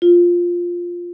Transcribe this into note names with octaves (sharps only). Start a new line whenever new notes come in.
F4